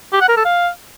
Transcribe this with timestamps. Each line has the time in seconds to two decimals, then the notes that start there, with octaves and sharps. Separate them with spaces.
0.12 G4
0.21 F#5
0.29 A#4
0.37 A4
0.45 F5